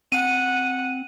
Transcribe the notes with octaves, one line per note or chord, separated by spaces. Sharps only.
C4 F#5 D#7